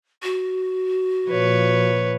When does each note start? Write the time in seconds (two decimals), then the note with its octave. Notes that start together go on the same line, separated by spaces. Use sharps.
0.23 F#4
1.29 A#2 F3 B4 C#5